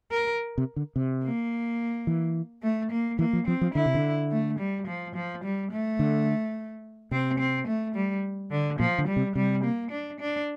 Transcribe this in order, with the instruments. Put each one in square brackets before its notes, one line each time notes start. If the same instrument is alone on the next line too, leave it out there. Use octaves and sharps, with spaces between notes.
[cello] A#4
[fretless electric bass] C3
D3
C3
[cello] A#3
[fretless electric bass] E3
[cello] A3
A#3
[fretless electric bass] E3 [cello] A#3
[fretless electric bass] F3
[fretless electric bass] F3 [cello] C4
[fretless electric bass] F3
[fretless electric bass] D3 [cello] E4
[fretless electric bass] C3
D3
[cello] A3
G3
F3
F3
G3
A3
[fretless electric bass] D3
[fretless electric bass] C3 [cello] C4
[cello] C4
A3
G3
D3
[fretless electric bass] A#2 [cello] F3
[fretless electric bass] D3
[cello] G3
[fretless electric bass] C3
[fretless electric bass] C3 [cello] G3
[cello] A#3
D4
D4